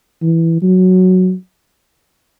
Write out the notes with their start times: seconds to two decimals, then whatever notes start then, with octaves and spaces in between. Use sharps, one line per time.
0.22 E3
0.62 F#3